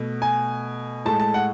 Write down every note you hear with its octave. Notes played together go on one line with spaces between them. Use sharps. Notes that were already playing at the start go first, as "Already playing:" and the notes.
Already playing: B2 A3
G#5
A2 G#3 A5
A5
F#5